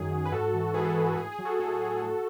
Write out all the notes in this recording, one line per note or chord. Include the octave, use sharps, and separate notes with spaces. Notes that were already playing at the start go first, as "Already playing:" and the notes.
Already playing: F#2 D#3 F#3 G#4
D#3 F#3
B4
G#2 F#4 A4
E3
G#2 G#4 B4
F#4 A4
E3 G#4
F#4 A4
A2 G#4
G#4
F#3
F#4 A4
A2 F#4 A4
F#3
A2